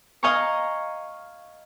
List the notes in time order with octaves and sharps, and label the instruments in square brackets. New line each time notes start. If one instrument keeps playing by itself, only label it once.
[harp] D#5 F5 G#5 A#5 C#6